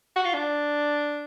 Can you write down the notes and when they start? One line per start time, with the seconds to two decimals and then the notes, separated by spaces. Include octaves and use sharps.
0.16 F#4
0.25 F4
0.34 D4